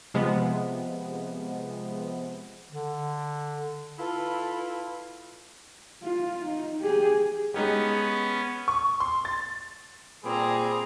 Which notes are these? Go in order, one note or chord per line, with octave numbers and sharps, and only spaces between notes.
C3 F3 G#3 B3
D3
E4 F4 A4 B4
F4
D#4
G4 G#4
G#3 B3 C#4 D#4 G4
C#6
C6
A6
A#2 G3 C4 G#4 A#5